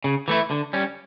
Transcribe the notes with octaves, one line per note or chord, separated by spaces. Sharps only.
C#3
E3 A3 E4
D3
G3 C#4